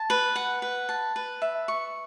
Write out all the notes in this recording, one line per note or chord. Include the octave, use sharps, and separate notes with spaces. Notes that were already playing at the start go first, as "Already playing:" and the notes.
Already playing: A5
B4
F#5
B4
A5
B4
E5
C#6